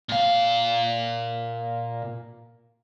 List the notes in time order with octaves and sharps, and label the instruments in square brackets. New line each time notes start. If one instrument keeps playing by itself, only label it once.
[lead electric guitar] A#2 F5